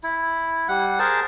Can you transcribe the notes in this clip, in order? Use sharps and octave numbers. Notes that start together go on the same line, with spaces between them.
E4
G3 F#5
G#4 A#4 C5 A5